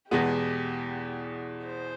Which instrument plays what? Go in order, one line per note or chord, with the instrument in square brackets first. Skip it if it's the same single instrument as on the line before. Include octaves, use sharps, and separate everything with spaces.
[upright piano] E2 B2 G#3 B3 [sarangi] G4
[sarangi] C5